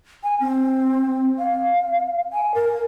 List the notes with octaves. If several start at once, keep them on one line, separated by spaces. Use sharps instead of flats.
G#5
C4
F5
G#5
A#4